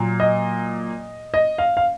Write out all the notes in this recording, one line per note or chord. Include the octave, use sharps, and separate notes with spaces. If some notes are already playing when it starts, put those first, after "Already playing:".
Already playing: A#2 F#3
D#5
D#5
F5
F5